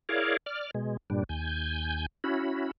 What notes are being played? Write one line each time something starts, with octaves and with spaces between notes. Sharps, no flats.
E4 G#4 A#4 C#5 D5 F5
D5 F6
B2 G#3
G2 A#2 G3 D4
D#2 G#5 G6
C#4 E4 F#4 B5